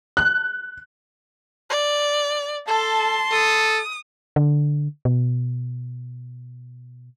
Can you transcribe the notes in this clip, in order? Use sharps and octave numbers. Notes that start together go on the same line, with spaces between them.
F#6
D5
A4 A5 C6
A4 D#6
D3
B2